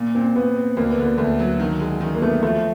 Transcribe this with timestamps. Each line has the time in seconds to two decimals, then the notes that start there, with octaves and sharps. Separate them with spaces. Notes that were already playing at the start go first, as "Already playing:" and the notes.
Already playing: A#2
0.15 A#2 C4
0.35 A#2 B3
0.56 C4
0.77 D2 A#3
0.90 B3
0.98 D3 A#3
1.18 D2 A3
1.39 F#3
1.60 D#3
1.80 G#3
2.01 D#3
2.15 A#3
2.22 A3 B3
2.43 F3 A3